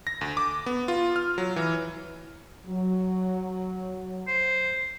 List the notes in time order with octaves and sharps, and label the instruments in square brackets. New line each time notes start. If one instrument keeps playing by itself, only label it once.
[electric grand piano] A#6
D2
D6
B3
F4
F6
F#3
E3
[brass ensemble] F#3
[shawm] C5